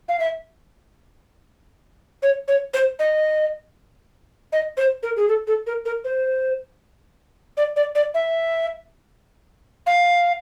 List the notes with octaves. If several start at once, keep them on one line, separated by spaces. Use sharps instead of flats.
F5
E5
C#5
C#5
C5
D#5
D#5
C5
A#4
G#4
A4
A4
A#4
A#4
C5
D5
D5
D5
E5
F5